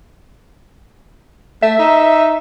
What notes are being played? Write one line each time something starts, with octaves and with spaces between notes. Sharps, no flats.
A3 E5
D#4